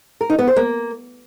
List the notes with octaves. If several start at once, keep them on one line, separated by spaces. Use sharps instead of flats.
A#4
D#4
B3
C5
A#3